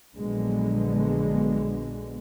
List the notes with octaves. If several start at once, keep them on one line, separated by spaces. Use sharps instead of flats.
A#1 D3 F#3 G#3 B3